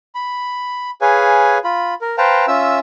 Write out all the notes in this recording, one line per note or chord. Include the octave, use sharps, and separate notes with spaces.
B5
G#4 B4 C#5 F5 G#5
F4 B5
A#4
B4 C5 F5 G5 A5 A#5
C#4 F4 E5 E6